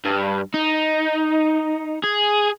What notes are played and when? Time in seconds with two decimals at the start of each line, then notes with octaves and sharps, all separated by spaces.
0.05 G2
0.54 D#4
2.04 G#4